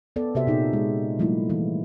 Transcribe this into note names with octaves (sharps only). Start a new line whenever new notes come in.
B3 A4 D5
C3 F#4 G4 C5 E5
A#2 B3 D#4 F#4 G#4
G#3
F3 G3 A3 A#3 E4
E3 E4